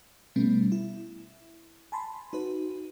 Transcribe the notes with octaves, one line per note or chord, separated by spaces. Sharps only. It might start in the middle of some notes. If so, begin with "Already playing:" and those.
B2 G3 A3 B3 C#4
E4
G#5 A5 B5 C6
D#4 F#4 B4